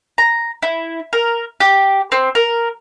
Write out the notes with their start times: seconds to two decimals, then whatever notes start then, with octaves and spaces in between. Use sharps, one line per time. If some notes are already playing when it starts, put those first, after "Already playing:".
0.18 A#5
0.63 E4
1.13 A#4
1.60 G4
2.12 C4
2.35 A#4